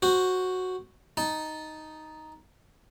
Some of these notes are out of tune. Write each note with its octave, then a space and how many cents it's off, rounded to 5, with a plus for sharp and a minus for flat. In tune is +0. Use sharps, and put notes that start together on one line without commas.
F#4 +0 C5 +0
D#4 +0 A5 -10